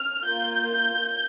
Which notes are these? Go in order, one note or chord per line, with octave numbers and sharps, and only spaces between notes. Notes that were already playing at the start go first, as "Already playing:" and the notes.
Already playing: F6
A#3 F4 G6
G6